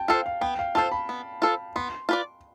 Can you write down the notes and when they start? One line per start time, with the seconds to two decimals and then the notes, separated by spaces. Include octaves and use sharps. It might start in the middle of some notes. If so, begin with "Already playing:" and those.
Already playing: G5 A5
0.08 F4 A4 C5 F5
0.26 F5
0.41 B3 G5
0.59 F5
0.75 F4 A4 C5 A5
0.92 B5
1.09 B3
1.42 F4 A4 C5
1.76 B3 C6
2.09 F4 B4 D5